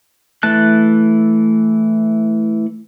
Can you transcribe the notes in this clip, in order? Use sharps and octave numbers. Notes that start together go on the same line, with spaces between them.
E3 A3 A5 F#6